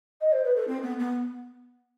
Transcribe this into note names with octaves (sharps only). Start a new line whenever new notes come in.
D#5
C5
B4
A4
C4
B3
B3